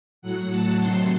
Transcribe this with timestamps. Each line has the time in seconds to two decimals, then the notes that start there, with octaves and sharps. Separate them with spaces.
0.22 A2 F#3 F#5
0.51 A5
0.79 C3 D#3 F#3 C6